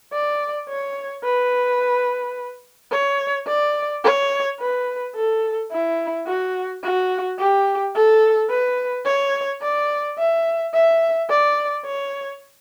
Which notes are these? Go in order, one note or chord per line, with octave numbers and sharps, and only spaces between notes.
D5
C#5
B4
C#5
D5
C#5
B4
A4
E4
F#4
F#4
G4
A4
B4
C#5
D5
E5
E5
D5
C#5